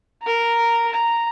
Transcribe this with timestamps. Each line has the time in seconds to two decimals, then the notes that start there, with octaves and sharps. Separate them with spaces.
0.23 A#4 A#5
0.92 A#5